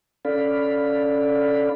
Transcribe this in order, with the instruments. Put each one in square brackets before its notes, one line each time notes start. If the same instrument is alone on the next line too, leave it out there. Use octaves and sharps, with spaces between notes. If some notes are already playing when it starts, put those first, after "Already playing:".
[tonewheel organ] C#4 A4 D5 F5 B5